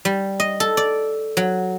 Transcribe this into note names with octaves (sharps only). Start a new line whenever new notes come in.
G3
D#5
A4
D5
F#3